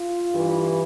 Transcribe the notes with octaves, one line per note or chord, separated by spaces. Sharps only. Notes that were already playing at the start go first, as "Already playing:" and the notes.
Already playing: F4
G2 E3